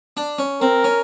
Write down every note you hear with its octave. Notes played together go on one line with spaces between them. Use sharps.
D4
C#4
C4 A#4
C#4